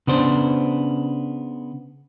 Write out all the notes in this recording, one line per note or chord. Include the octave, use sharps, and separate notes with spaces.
C#3 B3 D4 C5